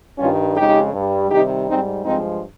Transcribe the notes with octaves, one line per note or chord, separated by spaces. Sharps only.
G2 D#3 G3 C#4 F4
F2 C#3 G#3 D#4 G4
G2 G3
C3 D#3 G3 D#4 G4
G#2 G3 C4 D#4
G2 F3 G#3 C4 D#4